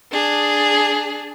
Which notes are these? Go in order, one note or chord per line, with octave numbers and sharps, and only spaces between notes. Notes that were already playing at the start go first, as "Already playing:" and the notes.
D4 G#4